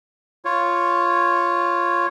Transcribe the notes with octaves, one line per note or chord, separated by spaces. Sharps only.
F4 C#5